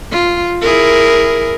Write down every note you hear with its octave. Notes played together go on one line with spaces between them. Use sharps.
F4
E4 G#4 A#4